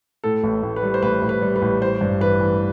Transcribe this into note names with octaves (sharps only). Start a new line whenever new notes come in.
A2 A4
A1
A1
B4
G3
C5
A1 B4
A1
B4
G3
B4
A1
A1 C5
G2
E3 B4
E3